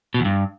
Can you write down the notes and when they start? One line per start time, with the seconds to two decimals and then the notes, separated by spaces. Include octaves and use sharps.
0.14 B2
0.20 E2
0.25 G2